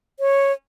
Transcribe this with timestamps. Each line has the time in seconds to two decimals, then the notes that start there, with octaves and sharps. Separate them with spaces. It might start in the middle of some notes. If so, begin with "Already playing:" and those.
0.20 C#5